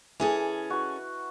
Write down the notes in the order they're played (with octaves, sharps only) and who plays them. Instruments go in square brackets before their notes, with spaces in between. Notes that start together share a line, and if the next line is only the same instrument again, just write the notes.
[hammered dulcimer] E3 [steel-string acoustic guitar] C#4 G#4 A4
[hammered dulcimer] F#4 B4